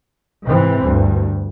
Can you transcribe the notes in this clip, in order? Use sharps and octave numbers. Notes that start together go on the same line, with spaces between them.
G#2 C3 E3 C4
D2 G2